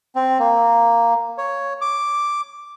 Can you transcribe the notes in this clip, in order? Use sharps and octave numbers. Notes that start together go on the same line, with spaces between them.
C4
A#3
C#5
D6